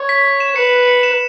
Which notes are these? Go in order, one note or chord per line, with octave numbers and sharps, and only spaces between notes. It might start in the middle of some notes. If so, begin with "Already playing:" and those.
Already playing: C#5
B6
E7
B4 C#7
C#7
E7